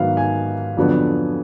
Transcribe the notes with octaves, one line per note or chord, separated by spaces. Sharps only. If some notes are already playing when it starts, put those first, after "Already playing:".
Already playing: G#2 D#3 F#3 B3 F5
G#5
F2 D3 F#3 B3